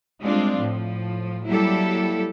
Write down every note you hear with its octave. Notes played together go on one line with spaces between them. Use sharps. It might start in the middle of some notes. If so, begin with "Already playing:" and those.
G3 G#3 C4 D4 F4
A2 F3
F#3 G3 A#3 E4 G4 A4